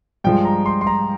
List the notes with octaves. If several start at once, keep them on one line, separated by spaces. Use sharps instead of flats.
G2 F3 G#3 G5
A#5
C6
C6
A#5